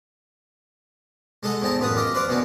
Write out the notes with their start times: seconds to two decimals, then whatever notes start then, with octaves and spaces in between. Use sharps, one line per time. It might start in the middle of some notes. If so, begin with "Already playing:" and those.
1.43 G#3 G#4 A4 D#5 F#5
1.61 E2 C4 D#4 A5
1.79 A1 F#2 F4 B4 D#6
1.95 F4 G4 D#5 F5
2.15 B4 C5 D5 F5
2.29 B2 E3 A#3 B3 D4